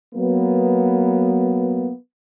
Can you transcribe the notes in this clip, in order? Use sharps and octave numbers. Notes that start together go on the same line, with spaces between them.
F#3 A#3 B3